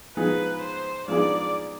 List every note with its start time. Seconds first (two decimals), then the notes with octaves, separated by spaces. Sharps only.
0.16 F3 G#3 B3 D#4 G#4 B4
0.62 C5
1.07 F3 G#3 B3 D#4 G#4 D5